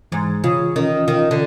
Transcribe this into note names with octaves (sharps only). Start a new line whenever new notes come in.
G#2 E3
C#3 F4
D#3 C#4
D#3 F4
D3